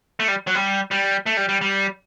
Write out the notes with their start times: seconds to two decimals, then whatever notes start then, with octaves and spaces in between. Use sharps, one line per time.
0.20 A3
0.28 G3
0.47 F#3
0.55 G3
0.91 G3
1.26 A3
1.37 G3
1.49 G3
1.61 G3